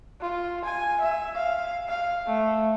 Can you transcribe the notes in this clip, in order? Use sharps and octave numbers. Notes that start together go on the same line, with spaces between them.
F4
G#5
E5
F5
F5
A3